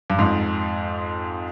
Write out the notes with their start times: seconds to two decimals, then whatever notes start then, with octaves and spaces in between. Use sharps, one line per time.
0.10 G2
0.19 F2 G#2